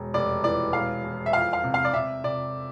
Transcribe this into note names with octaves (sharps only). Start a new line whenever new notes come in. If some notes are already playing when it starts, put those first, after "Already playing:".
Already playing: E1
F1 D5
E3 D5
E1 F5
E2
E5
F2 F5
F5
C3
F5
D5
C3 E5
C3 D5